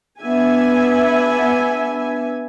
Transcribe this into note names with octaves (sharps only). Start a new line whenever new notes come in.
B3 D4 E5 G#5